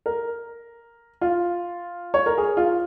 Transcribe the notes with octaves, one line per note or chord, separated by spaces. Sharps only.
A#4
F4
C#5
A#4
G#4
F4